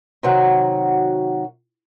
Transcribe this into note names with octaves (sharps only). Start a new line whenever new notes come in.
C3 D#3 F#3 F#4